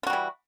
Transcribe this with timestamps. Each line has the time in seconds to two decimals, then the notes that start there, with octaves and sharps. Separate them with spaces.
0.03 F4
0.07 F#4
0.10 G3
0.13 E3